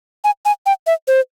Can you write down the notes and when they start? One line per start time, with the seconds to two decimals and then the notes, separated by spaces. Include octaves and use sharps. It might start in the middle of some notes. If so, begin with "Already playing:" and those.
0.24 G#5
0.45 G#5
0.66 G5
0.87 E5
1.08 C5